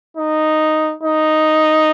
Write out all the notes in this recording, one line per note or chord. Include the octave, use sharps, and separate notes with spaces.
D#4
D#4